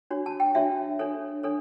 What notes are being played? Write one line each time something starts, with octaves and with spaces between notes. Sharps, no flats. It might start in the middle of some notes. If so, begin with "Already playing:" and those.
D4 F#4 C#5
A5
G5
D4 F#4 C#5 E5
D4 A4 C#5
D4 A4 C#5